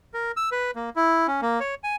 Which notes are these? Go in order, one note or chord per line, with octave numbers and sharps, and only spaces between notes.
A#4
E6
B4
A#3
E4
C#4
A#3
C#5
G#5